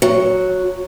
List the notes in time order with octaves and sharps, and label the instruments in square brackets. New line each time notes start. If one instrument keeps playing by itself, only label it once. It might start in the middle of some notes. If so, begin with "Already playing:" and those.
[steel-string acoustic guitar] F#3